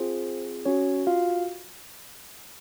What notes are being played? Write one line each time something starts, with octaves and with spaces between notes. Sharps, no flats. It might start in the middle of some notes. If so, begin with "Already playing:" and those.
Already playing: C4 F4 G#4 C5
C#4 F#4 C#5
F4 F5